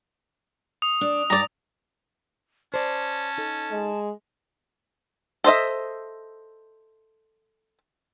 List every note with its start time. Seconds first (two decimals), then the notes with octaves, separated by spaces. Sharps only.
0.82 D#6
1.01 D4
1.30 G2 D5 A#5
2.74 C#4 C5 D5 A5
3.38 D#4 A4
3.71 G#3
5.44 A4 C5 D#5 E5